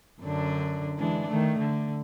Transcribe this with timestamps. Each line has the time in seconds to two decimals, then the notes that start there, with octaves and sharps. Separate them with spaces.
0.22 F#2 D3 D4
0.98 E3 G#3 D4
1.28 D#3 A3
1.59 D3